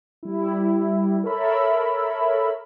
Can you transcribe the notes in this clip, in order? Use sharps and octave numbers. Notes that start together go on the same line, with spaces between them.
G3 E4
A4 A#4 C#5 E5 B5